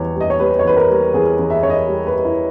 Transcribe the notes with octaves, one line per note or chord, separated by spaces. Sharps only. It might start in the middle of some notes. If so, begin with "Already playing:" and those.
Already playing: E2 G3 C#5
G3
D#5
C#5
G3 B4
C#5
E2 B4
A#4
G3
E2 G#4
E2
E5
E2 C#5
D#5
G3
B4
G3
E4